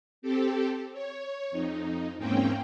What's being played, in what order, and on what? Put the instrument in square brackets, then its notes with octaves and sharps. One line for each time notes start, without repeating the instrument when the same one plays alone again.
[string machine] C4 G4 A4
C#5
F2 D#4
E2 G#2 A#3 C4 C#4 G5